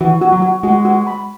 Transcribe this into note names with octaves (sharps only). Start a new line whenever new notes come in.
E3 F#4
F#4
F#3
F#4
G#3 F#4
F#4
B5